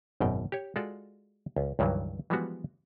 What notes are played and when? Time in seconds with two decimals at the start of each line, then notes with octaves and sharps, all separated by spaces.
0.20 G#1 F#2 B2 G5
0.52 G4 C#5
0.76 G#3 F4 F#4 A4 D5
1.56 C#2
1.79 C#2 G2 D#3 E3 F#3
2.30 E3 F3 G3 G#3 B3 F#4